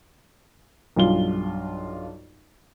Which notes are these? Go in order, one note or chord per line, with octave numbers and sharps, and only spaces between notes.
B1 G2 F4 G7